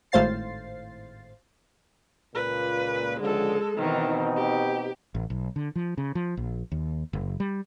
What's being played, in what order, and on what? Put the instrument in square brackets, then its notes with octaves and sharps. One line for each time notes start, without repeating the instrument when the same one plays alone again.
[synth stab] G#1 A2 C5 F5 A6 C7
[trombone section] C#2 A#2 [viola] B4
[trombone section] C#2 D3 F3 [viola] G#3 A4
[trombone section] B2 C4 D#4 [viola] D#3 E3
[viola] G4
[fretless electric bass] A1
B1
D3
F3
C#3
F3
A#1
D#2
F#1
G3